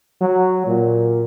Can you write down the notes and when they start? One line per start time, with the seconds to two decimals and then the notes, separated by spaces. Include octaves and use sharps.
0.21 F#3
0.67 A#2